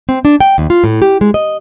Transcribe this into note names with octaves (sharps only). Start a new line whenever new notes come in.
C4
D4
G5
D#2
F4
A2
G4
G#3
D#5